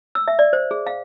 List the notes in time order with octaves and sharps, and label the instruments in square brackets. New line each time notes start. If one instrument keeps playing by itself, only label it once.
[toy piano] E6
E5
D5
C5
G#4
F5